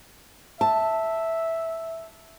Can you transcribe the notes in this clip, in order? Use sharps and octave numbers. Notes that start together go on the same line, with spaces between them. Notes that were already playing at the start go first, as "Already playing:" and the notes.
E5 A5